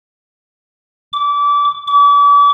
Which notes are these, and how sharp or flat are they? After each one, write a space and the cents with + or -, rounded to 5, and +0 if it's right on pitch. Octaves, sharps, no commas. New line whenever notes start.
D6 -25
D6 -40